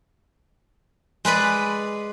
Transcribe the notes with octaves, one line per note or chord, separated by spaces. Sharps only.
G#3 B4 D5 B5